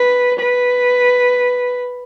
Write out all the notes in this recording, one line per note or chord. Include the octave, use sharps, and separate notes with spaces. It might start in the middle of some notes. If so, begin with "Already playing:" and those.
Already playing: B4
B4